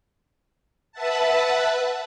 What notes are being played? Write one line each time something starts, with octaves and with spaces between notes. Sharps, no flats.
B4 E5 F#5 A5